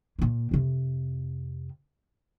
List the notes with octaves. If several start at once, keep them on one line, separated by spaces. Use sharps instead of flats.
A#2 A#3
F2 C3